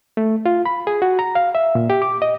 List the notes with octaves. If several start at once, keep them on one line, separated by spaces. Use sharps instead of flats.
A3
F4
B5
G#4
F#4
A#5
F5
E5
A#2
G4
D6
D#5